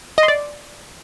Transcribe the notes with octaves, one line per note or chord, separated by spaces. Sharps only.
D#5
C6
D5